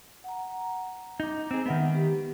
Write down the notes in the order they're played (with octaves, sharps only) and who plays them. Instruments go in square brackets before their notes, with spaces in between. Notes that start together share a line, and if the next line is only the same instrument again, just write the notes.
[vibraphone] F#5 A#5
[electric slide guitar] D#4 [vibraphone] D#5 A#5 D6
[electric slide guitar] C4 G#4
[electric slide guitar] D#3 B3 [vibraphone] G#3 E5 F#5
[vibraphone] G4